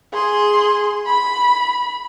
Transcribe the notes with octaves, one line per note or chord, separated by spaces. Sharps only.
G#4 C6
B5